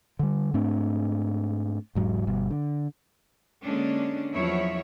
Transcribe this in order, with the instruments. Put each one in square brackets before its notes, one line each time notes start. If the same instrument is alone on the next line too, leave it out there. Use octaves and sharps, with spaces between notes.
[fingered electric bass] D3 G3
G#2 A3 C4 D4
E1 G#2 F#3
G1 B2 G3
D3
[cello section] D3 G#3 A#3 C#4 D4
E2 F3 F#3 E4 C#5 E5